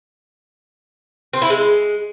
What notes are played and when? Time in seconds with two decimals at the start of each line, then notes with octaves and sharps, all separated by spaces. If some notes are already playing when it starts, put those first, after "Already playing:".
1.33 C4
1.42 E4
1.50 G#3